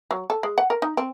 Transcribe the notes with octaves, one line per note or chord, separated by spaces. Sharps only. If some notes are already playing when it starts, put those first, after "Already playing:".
F#3
A4
G#3
F#5
A#4
D#4
C4